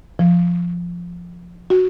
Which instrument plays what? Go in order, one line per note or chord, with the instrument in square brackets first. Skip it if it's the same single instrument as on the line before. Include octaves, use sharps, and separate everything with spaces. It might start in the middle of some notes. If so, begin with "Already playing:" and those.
[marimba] F3
F#4